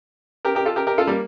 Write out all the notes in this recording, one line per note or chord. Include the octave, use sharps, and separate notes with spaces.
G4 A#4
G4 A#4
F4 A4
G4 A#4
G4 A#4
F4 A4
G3 A#3